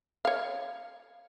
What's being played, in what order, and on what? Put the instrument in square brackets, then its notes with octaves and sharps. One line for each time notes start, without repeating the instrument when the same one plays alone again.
[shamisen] C#5 F5